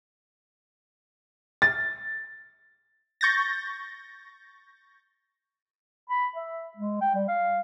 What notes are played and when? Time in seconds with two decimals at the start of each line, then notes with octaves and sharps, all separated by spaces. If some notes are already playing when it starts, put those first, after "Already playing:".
1.62 A6
3.21 C#6 G6 A6 A#6
6.10 B5
6.36 E5
6.77 G#3
7.01 G5
7.15 G3
7.28 F5